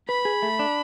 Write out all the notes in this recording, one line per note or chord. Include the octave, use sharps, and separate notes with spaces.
B4 B5
G#4
A3
D4